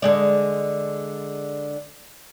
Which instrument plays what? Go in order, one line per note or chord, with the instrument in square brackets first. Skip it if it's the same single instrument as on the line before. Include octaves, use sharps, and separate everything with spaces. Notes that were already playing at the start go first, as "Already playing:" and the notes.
[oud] D3 G#3 D5